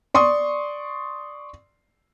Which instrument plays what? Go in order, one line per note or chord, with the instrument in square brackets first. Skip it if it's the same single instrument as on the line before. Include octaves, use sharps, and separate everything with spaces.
[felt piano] D5 C6 C#6 D#6